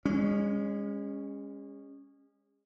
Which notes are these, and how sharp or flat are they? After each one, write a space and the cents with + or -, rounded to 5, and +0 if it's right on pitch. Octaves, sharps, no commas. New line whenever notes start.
G#3 -30 C#4 +0